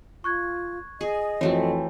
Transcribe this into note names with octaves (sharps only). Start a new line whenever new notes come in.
F4 C#6 F#6 G#6
G#4 D#5
F2 E3 A3 C4 F#4 C#5